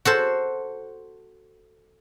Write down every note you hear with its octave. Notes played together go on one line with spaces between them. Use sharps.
F#4 A4 C5